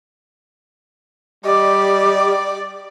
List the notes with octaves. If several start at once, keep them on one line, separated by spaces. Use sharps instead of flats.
G3 G4 D5 D#5